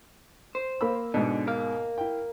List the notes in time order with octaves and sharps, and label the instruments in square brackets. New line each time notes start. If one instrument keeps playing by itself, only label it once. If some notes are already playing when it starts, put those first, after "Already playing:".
[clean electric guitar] C5
[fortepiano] A#3 B5 E6
[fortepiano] G#2 B2 [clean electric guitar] D3
[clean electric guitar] A#4 F5
[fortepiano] E4 G5